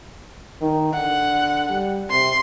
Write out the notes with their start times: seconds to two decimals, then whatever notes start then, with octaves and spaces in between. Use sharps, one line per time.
0.61 D#3
0.93 D3 F#5
1.69 G3
2.10 C3 C6